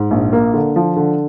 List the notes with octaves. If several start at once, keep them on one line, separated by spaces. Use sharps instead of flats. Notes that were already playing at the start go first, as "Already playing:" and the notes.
Already playing: G#2
A#1
A#3
D3
F3
D3